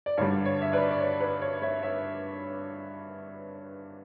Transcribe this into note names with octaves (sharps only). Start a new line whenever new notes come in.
D5
G2 D3 G3 C#5
C#5
E5
B4 D5
D5
C#5
B4
C#5
C#5 E5
C#5 E5